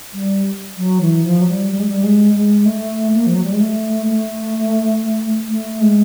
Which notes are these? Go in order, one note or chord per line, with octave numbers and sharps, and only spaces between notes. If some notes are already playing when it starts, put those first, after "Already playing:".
G3
F#3
E3
F3
F#3
G3
G3
G#3
G3
G#3
G#3
A3
A#3
F3
F#3
G3
G#3
A3
A3
A3
G#3